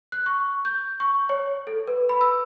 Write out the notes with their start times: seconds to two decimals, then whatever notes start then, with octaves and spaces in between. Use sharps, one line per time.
0.12 F#6
0.26 C#6
0.65 G6
1.00 C#6
1.29 C#5
1.67 A4
1.87 B4
2.09 B5
2.21 E6